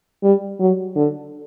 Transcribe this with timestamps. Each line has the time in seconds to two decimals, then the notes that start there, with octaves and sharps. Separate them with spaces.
0.23 G3
0.60 F#3
0.96 D3